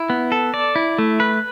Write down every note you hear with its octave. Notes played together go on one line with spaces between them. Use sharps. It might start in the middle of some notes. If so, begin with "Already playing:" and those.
Already playing: E4
B3
A4
D5
E4
A3
B4